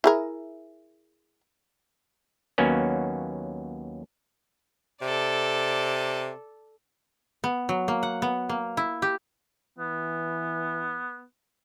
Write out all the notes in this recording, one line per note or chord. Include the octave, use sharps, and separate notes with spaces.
E4 G#4 A#4
D#2 F#3 A#3 B3 C#4
C3 A4 D5
B3
F#3
A#3
F#5
B3
A#3
E4
G4
E3 B3